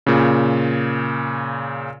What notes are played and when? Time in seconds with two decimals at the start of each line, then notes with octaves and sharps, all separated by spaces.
0.06 A#2 C#3